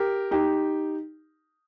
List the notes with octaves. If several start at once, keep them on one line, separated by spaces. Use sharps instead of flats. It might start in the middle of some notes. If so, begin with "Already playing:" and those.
Already playing: G4 A#4
D#4 G4